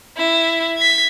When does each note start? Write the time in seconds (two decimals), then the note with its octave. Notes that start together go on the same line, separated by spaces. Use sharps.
0.18 E4
0.77 G#6 B6